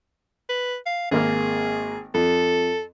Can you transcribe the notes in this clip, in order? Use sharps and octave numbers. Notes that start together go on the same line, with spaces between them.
B4
F5
G#1 A#3 G#4 F6
F2 A4